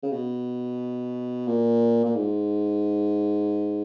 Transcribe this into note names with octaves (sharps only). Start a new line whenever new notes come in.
C#3
B2
A#2
A#2
G#2